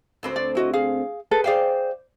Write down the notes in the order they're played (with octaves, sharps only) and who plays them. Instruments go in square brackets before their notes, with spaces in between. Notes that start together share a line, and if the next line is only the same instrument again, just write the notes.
[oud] D2 C4 B4
[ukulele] D5
E4 F#4 D#5
G#4 F5
G#4 A4 B4
[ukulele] G#4 F5 G5 [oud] C5 D5